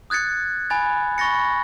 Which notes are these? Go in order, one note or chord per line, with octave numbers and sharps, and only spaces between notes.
D#6 F#6 G#6 A6 C#7
G#5 B5 A6
B5 C#6 A6 A#6 C#7